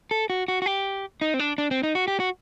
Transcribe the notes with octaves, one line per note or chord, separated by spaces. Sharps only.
A4
F#4
F#4
F#4
G4
D#4
C4
D4
D4
C4
D#4
F#4
G4
F#4